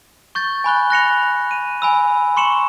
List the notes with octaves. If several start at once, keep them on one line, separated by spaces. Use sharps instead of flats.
C#6 G6 A6
G#5 B5 F#6 G7
F#6 A#6 C#7 F7
D#7
G#5 B5 E6
C6 C#6 C#7 E7 F#7